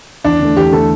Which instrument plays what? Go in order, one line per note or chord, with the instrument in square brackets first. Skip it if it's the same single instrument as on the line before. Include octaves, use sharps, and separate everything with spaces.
[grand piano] E2 [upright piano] D4
[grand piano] D3 A3
[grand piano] E2 [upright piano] G4
[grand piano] D3 A3 [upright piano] A4